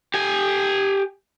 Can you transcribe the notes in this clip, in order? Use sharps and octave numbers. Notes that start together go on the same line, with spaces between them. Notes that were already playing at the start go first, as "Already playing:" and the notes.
G4 G#5